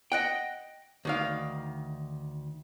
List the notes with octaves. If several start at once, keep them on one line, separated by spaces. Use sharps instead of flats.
D#5 F#5 G5
D2 D#3 F5